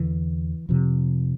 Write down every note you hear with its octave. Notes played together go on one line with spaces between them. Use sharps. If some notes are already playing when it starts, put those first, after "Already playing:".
Already playing: E2 D3 E3
F2 C3 F3